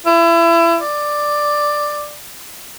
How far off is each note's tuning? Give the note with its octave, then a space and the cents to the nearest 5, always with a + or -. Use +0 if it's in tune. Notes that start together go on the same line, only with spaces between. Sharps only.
E4 +30
D5 +10